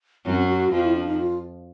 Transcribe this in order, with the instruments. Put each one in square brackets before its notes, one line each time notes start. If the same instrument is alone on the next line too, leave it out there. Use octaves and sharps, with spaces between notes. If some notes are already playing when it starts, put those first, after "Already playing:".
[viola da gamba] F#2 F#3 [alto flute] C4
[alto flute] F#4
[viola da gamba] F2 F3 [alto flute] F4
[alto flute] E4
D4
D#4
F4